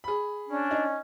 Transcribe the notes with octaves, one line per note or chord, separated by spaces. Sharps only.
G#4 B5
C#4 D4
D#4